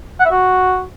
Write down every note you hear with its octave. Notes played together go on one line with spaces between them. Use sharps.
F#5
E5
F#4